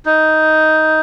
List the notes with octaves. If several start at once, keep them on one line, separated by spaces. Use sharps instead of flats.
D#4